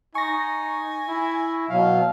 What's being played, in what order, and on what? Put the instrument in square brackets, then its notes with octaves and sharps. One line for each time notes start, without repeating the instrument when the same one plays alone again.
[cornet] D#4 [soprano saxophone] G#5 [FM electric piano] C#6 A#6
[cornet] E4
[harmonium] B2 F#3 [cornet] F5